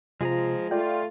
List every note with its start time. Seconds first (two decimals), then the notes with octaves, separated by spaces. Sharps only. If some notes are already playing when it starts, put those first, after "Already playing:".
0.21 C3 F3 G#3 F4 G#4 A#5
0.71 A3 F4 D5 G5